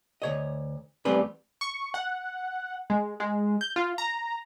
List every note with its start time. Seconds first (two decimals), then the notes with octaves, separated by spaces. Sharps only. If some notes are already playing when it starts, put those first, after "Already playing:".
0.22 D2 C#5 D#5
1.05 E2 G3 A3 C4 G#4 B4
1.61 C#6
1.94 F#5
2.90 G#3
3.20 G#3
3.61 G6
3.76 F4
3.98 A#5